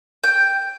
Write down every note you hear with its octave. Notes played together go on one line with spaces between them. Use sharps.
G5